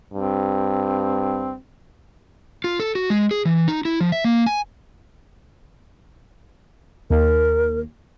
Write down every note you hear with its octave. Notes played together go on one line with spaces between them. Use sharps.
G2 C4
F4
A4
F#4
G#3
G#4
E3
D#4
E4
F3
E5
A#3
G#5
D#2 A#4